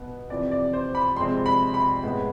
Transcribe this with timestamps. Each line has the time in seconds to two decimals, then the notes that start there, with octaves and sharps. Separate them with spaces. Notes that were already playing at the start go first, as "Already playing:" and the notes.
Already playing: B2 B3
0.29 F2 C3 E3 D5
0.51 D5
0.73 C5
0.95 B5
1.16 F2 C3 G#3 C4 C6
1.46 B5
1.74 B5
2.03 A2 G#3 B3